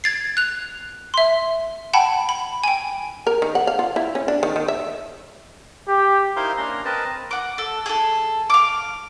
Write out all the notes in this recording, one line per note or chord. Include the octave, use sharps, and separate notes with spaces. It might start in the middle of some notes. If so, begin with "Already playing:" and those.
G#6 A6 C7
F#6 F7
E5 C6
F#5 G5 A5 B5
B5
G5 G#5
A#4
D#3
F#5
F5
F4
E4
C#4
D4
D#3
D#3
E5
G4
D#4 E4 A#4 C5 F5 C6
A#3 C#4 D4 A#5 C6
C4 A#4 B4 D#5 A5
F#5 D6
A4
G#4 A4
F5 D6